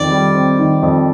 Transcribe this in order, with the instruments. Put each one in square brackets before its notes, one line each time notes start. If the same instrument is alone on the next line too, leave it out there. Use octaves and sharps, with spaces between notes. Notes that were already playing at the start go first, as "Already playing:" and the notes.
Already playing: [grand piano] F2 D#3 [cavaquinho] D5
[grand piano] G3
C4
D#3
F2